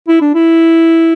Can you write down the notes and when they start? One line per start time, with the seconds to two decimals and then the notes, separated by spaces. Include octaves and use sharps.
0.08 E4
0.21 D4
0.35 E4